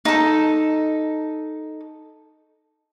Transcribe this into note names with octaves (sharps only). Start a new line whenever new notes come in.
D#4 A4